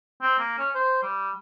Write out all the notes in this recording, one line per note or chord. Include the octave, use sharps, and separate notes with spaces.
C4
A#3
C#4
C5
G3